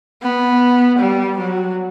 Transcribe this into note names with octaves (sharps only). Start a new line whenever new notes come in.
B3
G3
F#3